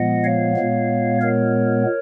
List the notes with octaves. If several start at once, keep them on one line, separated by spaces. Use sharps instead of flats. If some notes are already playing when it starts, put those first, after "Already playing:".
Already playing: A#2 F3 G#3 B3 D#5 F#5
C#5 F5
A#2 G#3 B3
A#4 C#5